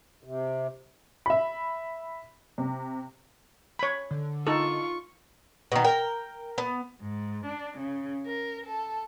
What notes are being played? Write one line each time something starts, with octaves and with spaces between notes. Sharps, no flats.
C3
E5 B5
C3
C#5 B5
D3
D#4 F4 A4 C#6
B2 D#3
A#4 G5
B3
G#2
D4
C#3
A#4
A4